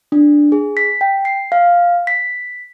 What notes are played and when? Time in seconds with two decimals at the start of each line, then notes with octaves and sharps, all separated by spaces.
0.12 D4
0.52 G#4
0.77 B6
1.01 G5
1.25 C7
1.52 F5
2.07 B6